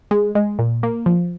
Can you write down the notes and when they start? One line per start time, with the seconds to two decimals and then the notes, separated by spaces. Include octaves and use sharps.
0.11 G#3
0.35 G#3
0.59 A#2
0.83 A#3
1.06 F3